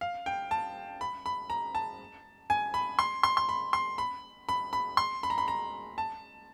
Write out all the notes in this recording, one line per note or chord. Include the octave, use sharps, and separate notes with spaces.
F5
G5
A5
B5
B5
A#5
A5
G#5
B5
C6
C6
C6
B5
C6
B5
B5
B5
C6
B5
A#5
B5
A#5
A5